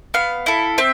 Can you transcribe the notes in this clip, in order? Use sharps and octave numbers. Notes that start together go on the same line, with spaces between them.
B3 F5
E4 A4
C4 E5